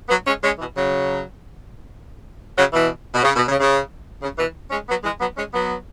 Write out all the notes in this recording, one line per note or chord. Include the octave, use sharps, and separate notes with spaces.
F#3 B3
G#3 C#4
G#3 C#4
B2 E3
C#3 F#3
C#3 F#3
B2 E3
B2
C#3
B2
C#3
C#3
C#3
B2 E3
G#3 C#4
F#3 B3
E3 G#3
F#3 B3
G#3 C#4
F#3 B3